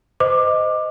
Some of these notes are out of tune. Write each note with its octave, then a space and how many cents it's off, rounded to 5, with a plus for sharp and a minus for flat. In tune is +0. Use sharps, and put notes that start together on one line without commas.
C5 -30 D#5 +0 D6 +15